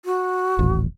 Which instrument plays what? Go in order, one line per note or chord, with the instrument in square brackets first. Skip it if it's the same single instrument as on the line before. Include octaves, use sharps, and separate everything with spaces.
[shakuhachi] F#4
[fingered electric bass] D#1 A1